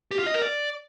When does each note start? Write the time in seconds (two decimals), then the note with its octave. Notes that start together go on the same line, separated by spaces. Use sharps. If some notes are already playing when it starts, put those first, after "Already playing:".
0.11 G4
0.19 F4
0.27 D#5
0.34 A#4
0.42 D5